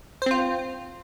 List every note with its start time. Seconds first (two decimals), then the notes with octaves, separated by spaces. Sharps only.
0.22 C5
0.26 C4
0.31 F4